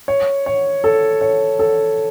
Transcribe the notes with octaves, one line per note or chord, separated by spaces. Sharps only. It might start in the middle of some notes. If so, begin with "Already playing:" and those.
C#5
C#5
A4
C#5
A4